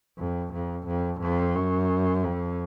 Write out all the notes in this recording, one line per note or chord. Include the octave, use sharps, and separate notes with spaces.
F2
F2
F2
F2
F#2
F2